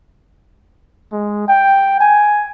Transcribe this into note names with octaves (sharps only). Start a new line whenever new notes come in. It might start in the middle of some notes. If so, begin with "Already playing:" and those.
G#3
G5
G#5